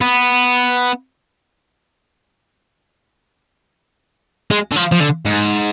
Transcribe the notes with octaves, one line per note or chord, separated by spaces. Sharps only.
B3
G#3
D3
F3
F3
D3
G#2